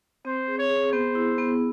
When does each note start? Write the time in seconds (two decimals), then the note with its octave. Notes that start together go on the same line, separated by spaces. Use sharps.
0.25 C4 C5
0.48 G#4
0.59 C#5
0.70 G#4
0.92 B3 C5
1.15 E4
1.38 B3